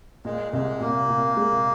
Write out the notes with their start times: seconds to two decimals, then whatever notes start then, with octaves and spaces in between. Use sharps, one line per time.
0.25 A#2 G#3
0.53 C2 G#3
0.80 A#2 A#3
1.09 A#2
1.37 G#3